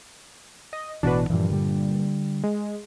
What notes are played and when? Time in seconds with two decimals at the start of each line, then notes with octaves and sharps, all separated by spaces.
0.73 D#5
1.03 A1 B2 E3 D4 F#4 B4
1.30 G2 A#2 E3 F3
1.50 D3 G3
2.44 G#3